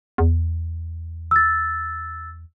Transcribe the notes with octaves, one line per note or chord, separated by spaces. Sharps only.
E2
E6 A6